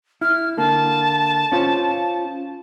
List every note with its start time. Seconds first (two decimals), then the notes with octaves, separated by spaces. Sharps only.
0.21 E4 F6
0.57 D3 A#3 A5
1.52 C#4 F4 C5